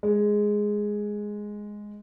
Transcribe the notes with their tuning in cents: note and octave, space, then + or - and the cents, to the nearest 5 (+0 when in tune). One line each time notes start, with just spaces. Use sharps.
G#3 +0